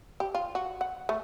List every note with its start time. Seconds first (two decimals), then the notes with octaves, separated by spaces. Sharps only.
0.20 G4
0.35 F4
0.55 F#4
0.81 F#5
1.09 A3